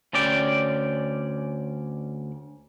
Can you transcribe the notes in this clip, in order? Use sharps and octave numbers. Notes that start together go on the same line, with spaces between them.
D2 C#4 D5 G5